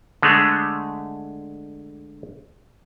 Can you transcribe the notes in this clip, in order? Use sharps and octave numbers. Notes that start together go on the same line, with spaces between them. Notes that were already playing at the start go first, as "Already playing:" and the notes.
D3 G#3 A3